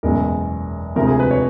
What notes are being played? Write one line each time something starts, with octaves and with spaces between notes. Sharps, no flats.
F#1 E2 B2 G#3 A#4
D2 C3 F3 G#3 A#4
G#4
B4
C#5